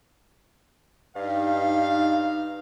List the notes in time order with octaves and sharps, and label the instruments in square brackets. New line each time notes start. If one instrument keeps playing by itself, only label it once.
[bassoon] G2 [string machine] D#4 [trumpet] F5